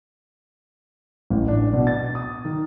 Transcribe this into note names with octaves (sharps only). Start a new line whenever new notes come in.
A1
D4
B2
A6
D#6
D#3